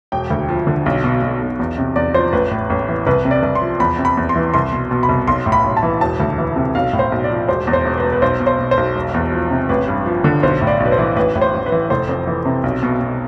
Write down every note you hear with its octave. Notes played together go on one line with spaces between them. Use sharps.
E1 G5
D2
F3
D3
B1
B2
B2
B1
E2
C3
E2 D5
F3 C5
A1 B4
A2
A1
E3
C2 B4
C3
D5
C2
C6
F3
E2 B5
C3
B5
E2
C6
E3
C2 C6
B2
B2
B5
C2
B1 C6
A2
B5
B1
A5
E3
E1 A5
D2
E3
C3
B1 F5
A2
C5
B1
D5
F3
E1 C5
E2
C5
E1
B4
B2
B4
B1 C5
B2
C5
B2
C5
B1
E1
E2
F3
C3
A1 B4
G2
F3
D3
B1 C5
A2
D5
B1
B4
C5
E3
A1 B4
A2
C5
A1
B4
E3
F1 C5
F2
E3
C3
B1
B2
B2